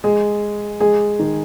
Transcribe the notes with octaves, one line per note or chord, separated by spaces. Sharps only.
G#3 G#4
G#3 G#4
D#3 D#4